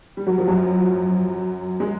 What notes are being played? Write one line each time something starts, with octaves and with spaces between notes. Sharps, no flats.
G3
F#3
F3
F#2 F#3
G#3